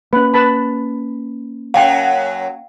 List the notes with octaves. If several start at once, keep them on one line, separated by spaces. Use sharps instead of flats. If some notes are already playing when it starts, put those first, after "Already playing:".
A#3 C#4 B4
B4 A5 B5
F#2 F#3 F5 G5